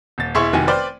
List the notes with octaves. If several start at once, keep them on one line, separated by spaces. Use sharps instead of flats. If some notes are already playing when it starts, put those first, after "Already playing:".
D#1 A6
E1 E4 G#4 E5 C6 C#6
F1 D#3 F#4 G4 G#5
B4 C5 D5 G5 F6